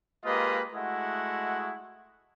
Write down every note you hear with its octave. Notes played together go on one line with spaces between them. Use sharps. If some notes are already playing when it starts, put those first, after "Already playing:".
G#3 A#3 F4 G4 B4 D#5
G#3 A3 E4 F#4 D#5 F#5